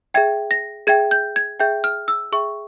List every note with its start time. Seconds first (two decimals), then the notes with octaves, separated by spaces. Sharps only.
0.14 G#4 E5 G5 G#6
0.51 A#6
0.87 G#4 E5 G5 G#6
1.11 G6
1.36 G#6
1.60 G#4 E5 G5 G6
1.84 F6
2.08 E6
2.32 G#4 E5 G5 C#6